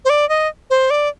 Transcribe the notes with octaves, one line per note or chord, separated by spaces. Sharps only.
C5
D5
D#5
C5
D5